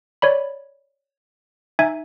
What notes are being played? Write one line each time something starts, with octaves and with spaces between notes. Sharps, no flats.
C#5 D5 B5
D#4 E5 G#5 G#6